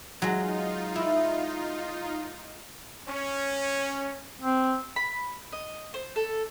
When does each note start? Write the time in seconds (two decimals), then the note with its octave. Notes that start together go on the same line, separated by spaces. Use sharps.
0.22 F#3 G#3 D#4 F4
0.96 E4
3.07 C#4
4.41 C4
4.96 B5
5.52 D#5
5.94 C5
6.16 A4